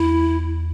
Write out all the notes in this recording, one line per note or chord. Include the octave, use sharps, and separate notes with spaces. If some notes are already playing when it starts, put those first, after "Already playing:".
Already playing: E2 E4